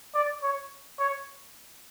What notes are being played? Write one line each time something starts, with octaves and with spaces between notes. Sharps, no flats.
D5
C#5
C#5